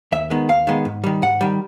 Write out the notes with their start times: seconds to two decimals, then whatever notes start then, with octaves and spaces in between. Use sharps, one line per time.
0.12 D#2 E5
0.30 D#3 G#3 B3
0.49 D#2 F5
0.67 D#3 G#3 B3
0.85 G#2
1.04 D#3 G3
1.22 G#2 F#5
1.41 D#3 G3